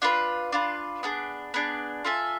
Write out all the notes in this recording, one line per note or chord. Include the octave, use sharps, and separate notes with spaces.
D4 F4 B4
D4 F4 B4
B3 D4 G#4
B3 D4 G#4
F4 A4 E5 G#5